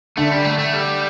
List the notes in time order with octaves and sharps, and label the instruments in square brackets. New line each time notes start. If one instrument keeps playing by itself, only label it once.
[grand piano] D3 [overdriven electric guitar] A3
[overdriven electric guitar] G3
A3
A3
G3